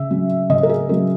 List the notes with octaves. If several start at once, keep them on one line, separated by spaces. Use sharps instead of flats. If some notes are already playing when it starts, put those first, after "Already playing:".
Already playing: C#3 E5
F#3 C#4
C#3 D#5
A#4
G#4
F#3 C#4 A#4